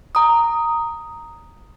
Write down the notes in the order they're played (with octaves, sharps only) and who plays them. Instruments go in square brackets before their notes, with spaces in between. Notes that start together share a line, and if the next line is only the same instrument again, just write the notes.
[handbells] A#5 D#6